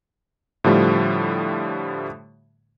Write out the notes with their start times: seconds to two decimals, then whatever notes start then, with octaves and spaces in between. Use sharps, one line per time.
0.64 A2 D3 F3 G3 A3